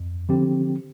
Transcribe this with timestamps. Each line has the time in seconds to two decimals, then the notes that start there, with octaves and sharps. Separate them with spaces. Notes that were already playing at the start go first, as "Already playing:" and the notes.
Already playing: F2
0.29 D3 F3 C4 G4